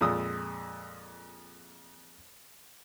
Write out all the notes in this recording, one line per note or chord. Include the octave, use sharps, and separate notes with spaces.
F2 A#2 G#3 D#6 E6